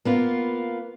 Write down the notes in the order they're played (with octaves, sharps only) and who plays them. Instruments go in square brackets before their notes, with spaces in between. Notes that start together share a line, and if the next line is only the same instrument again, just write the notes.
[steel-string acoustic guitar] A#3 B3 F4